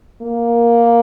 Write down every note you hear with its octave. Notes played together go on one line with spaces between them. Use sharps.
A#3